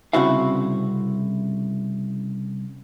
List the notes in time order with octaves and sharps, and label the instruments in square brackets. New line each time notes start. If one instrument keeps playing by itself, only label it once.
[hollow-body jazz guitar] C2 C#3 C4 E4 F#4 F5